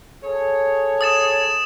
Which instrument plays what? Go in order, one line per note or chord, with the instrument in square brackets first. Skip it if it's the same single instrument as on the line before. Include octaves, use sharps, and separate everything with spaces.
[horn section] G#4 A4 C#5
[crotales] D#6 A6 E7